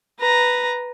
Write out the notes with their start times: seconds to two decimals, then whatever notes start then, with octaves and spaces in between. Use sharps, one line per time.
0.19 B4 A#5